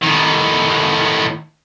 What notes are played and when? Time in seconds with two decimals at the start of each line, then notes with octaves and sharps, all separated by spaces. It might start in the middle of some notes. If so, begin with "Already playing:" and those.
0.02 A2 D#3